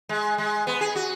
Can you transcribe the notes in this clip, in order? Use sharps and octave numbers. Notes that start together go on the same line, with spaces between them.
G#3
G#3
B3
G#4
F#4